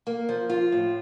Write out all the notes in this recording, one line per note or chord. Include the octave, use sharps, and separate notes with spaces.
A#3
F3
F4
A2